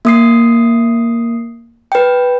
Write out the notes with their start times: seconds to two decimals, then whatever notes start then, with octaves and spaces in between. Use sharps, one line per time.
0.05 A#3 D#6 C7
1.92 B4 G5